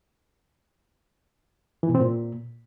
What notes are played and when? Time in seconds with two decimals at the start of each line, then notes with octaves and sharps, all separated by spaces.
1.83 E3
1.89 B2
1.95 C4
2.00 A#2